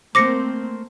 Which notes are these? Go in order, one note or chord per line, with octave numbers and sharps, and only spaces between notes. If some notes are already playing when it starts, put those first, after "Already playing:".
A3 A#3 C4 A#4 C5 D6 A#6 C#7